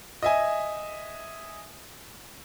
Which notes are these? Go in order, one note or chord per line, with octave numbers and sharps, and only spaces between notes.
D#5 E5 G#5